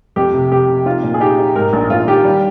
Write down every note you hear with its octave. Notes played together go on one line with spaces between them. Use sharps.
F2 G4
C3
C3 G4
C3
D#4 F4
A#2
G#4
D#4 G4
D#4
G#2 A#4
A#1
A#1 F4
D#3 G4
G3